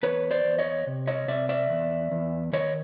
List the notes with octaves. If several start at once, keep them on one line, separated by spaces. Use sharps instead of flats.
E2 B4 C#5
C5 D5
E2
C#5 D#5
C3
C#5 D#5
C3 D5 E5
D5 E5
E2
E2
D#3 C#5 D#5